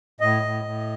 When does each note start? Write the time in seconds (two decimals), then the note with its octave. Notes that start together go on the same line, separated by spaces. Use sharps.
0.20 A2 D#5
0.43 A2
0.64 A2